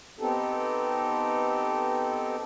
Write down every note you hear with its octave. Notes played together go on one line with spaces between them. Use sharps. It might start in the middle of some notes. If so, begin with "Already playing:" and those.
B3 C4 D#4 G4 A4